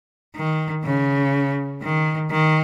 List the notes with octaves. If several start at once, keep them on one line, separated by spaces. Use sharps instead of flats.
D#3
C#3
D#3
D#3